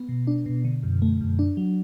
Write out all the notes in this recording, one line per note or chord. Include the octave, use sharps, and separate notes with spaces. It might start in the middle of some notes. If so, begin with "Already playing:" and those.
Already playing: B3
B2
D4
B2
D3
F#2
A3
F#2
D4
F#3